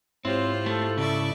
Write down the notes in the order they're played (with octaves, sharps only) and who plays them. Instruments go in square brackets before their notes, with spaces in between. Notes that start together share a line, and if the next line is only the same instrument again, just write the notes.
[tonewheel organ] G#2 E4 F#6 [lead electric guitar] C4 [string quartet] F4 G4 C5 [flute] C#5
[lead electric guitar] A3 [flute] A4
[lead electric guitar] C#3 [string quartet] D5 E5 C#6